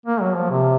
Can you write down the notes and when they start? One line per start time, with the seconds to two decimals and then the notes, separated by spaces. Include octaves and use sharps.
0.06 A#3
0.21 F#3
0.36 F3
0.50 C3